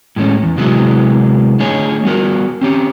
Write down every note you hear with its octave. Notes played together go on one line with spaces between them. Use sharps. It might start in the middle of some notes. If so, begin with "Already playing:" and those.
A2 G#3 A3 C#4
E2
C3 F#3 G#3 B3 E4 F#4
D3 A3 G#4 C#5 D#5
G3 B3 F#4 A#4
C4 C#4 G4